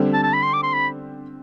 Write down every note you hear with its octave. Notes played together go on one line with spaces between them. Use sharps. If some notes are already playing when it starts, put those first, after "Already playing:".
Already playing: D3 G3 C4
A5
A5
B5
C6
D6
C6
B5